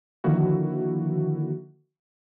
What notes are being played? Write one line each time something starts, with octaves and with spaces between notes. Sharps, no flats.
D3 D#3 F3 A#3 E4 F#4